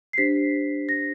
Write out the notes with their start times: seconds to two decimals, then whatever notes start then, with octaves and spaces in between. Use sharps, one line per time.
0.13 C7
0.18 D4 G4 C5 B6
0.89 A#6